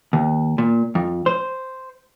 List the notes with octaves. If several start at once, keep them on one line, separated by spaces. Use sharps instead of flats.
D#2
A#2
F2
C5